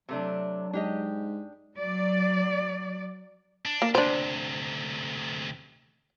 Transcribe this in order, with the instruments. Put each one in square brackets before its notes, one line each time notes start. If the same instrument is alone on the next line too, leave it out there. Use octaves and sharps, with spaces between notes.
[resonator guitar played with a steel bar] C3 A3 D4 [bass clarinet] F#3
[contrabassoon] G#2 [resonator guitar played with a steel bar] D4 G4 D#5
[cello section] F#3 D5
[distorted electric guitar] D4
[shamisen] A#3
[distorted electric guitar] D2 C3 [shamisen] D4 C5